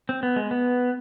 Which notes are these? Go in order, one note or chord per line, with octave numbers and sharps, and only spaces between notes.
C4
B3
G#3
B3